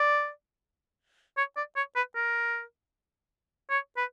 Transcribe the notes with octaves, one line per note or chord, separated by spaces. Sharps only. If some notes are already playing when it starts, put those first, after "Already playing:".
Already playing: D5
C#5
D5
C#5
B4
A#4
C#5
B4